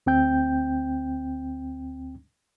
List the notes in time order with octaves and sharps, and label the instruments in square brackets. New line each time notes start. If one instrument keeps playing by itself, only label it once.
[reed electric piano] D2 C4 G5 G6